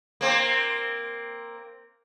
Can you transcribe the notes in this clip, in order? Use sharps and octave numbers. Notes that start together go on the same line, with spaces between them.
A#3 C4